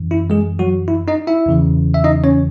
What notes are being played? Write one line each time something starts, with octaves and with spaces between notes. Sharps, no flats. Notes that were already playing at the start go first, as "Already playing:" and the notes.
Already playing: F#2 E3
E4
G#3 G#4
F#3 F#4
E4
D#4 D#5
E4 E5
E2 C#3 E3
E5
D#4 D#5
C#4 C#5